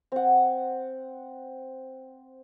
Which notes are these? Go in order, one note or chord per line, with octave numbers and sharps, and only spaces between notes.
C4 F#5